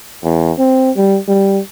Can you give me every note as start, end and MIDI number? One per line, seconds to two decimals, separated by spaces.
0.24 0.52 40
0.59 0.91 60
0.97 1.18 55
1.28 1.60 55